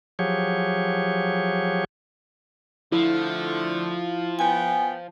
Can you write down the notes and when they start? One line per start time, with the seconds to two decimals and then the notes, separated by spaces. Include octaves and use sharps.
0.19 F3 F#3 G4 G#4 C#5
2.92 D3 F3 A3 E4
4.39 B3 G5 G#5